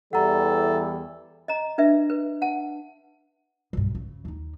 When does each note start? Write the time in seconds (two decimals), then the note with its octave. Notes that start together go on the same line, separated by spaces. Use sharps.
0.13 E2 E3 G3 A4 F#5 A#5
1.48 D#5 A#5
1.78 D4 B4 E5
2.10 B4
2.42 F#5 A5
3.73 B1 G2
3.95 C#3
4.25 D#2 D#4